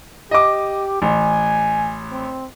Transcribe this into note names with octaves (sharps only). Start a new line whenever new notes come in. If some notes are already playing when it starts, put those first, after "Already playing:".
G4 D#5 D6
A1 G#5
C4